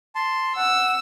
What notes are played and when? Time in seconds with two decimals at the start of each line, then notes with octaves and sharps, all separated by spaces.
0.15 A5 C6
0.56 F#5 E6